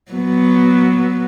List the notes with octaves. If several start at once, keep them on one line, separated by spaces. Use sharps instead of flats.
F#3 B3